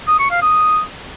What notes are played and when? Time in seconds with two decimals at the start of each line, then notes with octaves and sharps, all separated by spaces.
0.08 D#6
0.19 C#6
0.31 F5
0.42 D#6